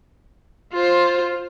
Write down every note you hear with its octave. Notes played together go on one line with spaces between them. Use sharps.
F4 C5